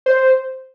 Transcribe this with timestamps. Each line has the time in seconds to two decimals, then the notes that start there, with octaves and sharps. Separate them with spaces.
0.06 C5